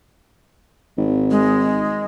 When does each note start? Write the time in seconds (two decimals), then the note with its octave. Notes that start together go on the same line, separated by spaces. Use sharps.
0.97 G#1
1.31 G#3